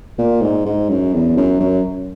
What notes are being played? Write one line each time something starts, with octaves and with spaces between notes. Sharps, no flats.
A#2
G#2
G#2
F#2
E2
F#2
F#2